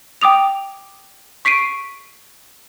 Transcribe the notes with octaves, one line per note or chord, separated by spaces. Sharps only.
G5 D6 D#6 F7
C#6 B6 C7 D7 D#7